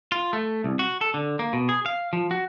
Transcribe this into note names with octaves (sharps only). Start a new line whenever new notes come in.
F4
A3
C2
F#4
A4
D3
A#3
B2
G#4
F5
F3
F#4